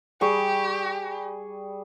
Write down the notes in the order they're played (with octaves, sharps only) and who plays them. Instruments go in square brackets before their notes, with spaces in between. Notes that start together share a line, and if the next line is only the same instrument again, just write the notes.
[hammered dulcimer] G3 [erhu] G4 [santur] G#4 C#6